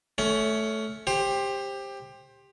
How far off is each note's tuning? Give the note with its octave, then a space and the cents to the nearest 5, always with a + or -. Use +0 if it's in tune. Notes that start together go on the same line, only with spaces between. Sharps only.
A3 -10 C#4 +15
G4 +15 C5 +20